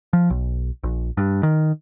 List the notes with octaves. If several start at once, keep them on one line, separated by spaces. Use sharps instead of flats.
F3
B1
A#1
G2
D#3